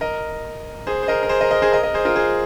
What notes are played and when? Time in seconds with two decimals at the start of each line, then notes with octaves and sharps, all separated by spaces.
0.01 A#4 D#5
0.87 G#4 C5
1.03 C5
1.08 A#4 D#5
1.23 A#4
1.29 G#4 C5
1.41 A#4 D#5
1.51 A#4 D#5
1.62 G#4 C5
1.72 A#4 D#5
1.83 A#4 D#5
1.94 G#4 C5
2.05 F4 A#4
2.16 G#4 C5